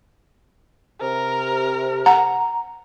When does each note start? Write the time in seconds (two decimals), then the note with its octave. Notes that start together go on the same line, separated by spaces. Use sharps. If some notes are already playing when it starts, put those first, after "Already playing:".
1.01 C3 A#4
2.06 F#5 A#5